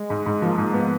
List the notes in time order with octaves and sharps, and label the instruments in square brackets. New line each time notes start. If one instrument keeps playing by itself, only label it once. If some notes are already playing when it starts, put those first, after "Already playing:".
Already playing: [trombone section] G#3
[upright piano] G#2
G#2
[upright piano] F3 [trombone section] A#3
[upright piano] G#2
B3